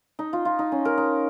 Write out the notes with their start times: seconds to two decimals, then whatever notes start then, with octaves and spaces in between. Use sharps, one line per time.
0.19 D#4
0.33 F4
0.45 F4
0.59 D#4
0.72 C#4
0.85 A#4
0.98 D#4